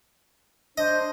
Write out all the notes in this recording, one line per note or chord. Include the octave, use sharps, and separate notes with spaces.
D4 C5 D#5